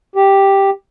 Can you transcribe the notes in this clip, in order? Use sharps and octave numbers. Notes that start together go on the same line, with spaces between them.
G4